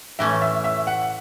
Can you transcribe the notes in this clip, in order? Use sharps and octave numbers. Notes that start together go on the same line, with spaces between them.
A2 E3 A3 C#4 E5
E5
E5
F#5